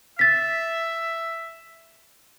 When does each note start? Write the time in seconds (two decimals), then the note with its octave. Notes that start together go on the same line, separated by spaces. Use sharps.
0.19 E5 A6 B6